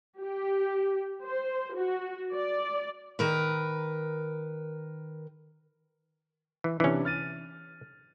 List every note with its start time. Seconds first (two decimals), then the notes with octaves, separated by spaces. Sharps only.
0.20 G4
1.26 C5
1.77 F#4
2.35 D5
3.19 D#3 A#4 B4
6.64 E3
6.80 C3 E3 C#4 D4
7.05 F6 A6 D#7